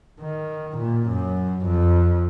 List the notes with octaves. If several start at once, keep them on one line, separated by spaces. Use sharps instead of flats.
D#3
A#2
F#2
F2